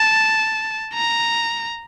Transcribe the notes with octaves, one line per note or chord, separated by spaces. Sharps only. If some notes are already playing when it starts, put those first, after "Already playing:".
Already playing: A5
A#5